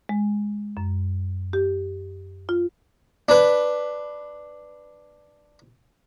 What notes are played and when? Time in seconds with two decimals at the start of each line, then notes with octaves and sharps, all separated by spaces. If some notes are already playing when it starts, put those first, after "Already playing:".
0.09 G#3
0.77 F#2
1.53 G4
2.49 F4
3.29 D4 B4